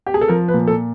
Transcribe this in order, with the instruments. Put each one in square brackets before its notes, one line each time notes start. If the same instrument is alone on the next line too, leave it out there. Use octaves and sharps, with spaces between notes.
[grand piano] G4
G#4
A4
F3 A#4
B4
A#2
A4